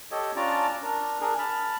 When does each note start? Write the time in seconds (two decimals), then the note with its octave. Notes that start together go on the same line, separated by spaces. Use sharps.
0.11 G4 A4 C#5 D#5
0.36 C#4 D4 F4 D5 A5 A#5
0.83 D4 A#4
1.21 D4 G#4 A#4
1.38 A5 B5 F6